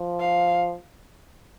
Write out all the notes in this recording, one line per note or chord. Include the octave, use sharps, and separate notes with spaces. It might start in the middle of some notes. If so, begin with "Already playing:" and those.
Already playing: F3
F5